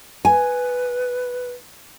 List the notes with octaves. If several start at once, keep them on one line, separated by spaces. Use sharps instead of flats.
B4 G#5